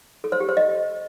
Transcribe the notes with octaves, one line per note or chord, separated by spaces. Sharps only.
A4
C5
G4
C5
D#5